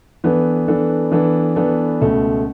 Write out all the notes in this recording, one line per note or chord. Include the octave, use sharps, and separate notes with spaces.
E3 B3 D4 A4
E3 B3 D4 A4
E3 B3 D4 A4
E3 B3 D4 A4
C#2 B2 A3